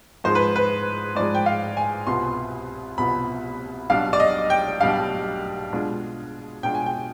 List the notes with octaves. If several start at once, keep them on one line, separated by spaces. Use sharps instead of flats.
G#2 F3 G#3 C5
B4
B4
G#2 F3 G#3 D5
G5
F5
G#5
C2 B2 B3 F4 C6
C2 B2 B3 F4 B5
B1 B2 G3 D4 F5
D5
D#5
G5
B1 B2 G3 D4 F5
B2 G#3 D4 F4
B2 G#3 D4 F4 G5
G#5
G5